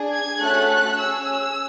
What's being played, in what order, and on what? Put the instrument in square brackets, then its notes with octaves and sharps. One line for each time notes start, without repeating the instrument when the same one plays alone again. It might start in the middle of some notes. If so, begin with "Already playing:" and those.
Already playing: [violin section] D4 G#4
G#6
A3 C#4 F#4 A4 F#6
F#6
C#4 G#4 E6